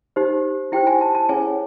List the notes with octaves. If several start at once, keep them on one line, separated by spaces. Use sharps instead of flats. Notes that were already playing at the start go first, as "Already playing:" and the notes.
D#4 G4 C5
E4 G4 C5 G5
G#5
A5
A5
C#4 E4 G#4 C#5 G#5